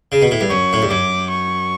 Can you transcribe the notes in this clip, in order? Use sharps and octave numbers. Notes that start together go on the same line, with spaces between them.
C#3
B2
A2
G2
F#2 C#6
A2
G2
F#2 D6
C#6